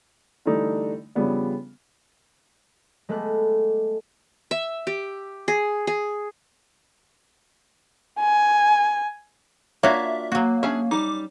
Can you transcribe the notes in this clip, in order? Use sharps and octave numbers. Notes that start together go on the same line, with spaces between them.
D3 E3 G3 A3 D4 D#4
C#3 F3 G3 B3 D4
G#3 A3 B3 A4 D6 F#6
E5
G4
G#4
G#4
G#5
A#3 D4 F4 F#4 C#5 E5
F#3 A#3 F#4
C#4 D4 G#4 E5
G3 D#4 D6